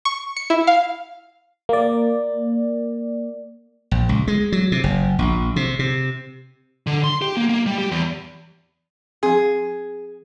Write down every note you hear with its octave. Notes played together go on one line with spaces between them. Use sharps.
C#6
C#7
E4
F5
A#3 D5
A#1
C#2
G#3
F#3
C3
F#1
A#1
C3
C3
D3
C6
G4
A#3
A#3
G3
G4
E2
F3 C4 G#4